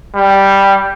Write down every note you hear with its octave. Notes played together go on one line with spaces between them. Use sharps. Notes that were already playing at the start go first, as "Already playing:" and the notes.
G3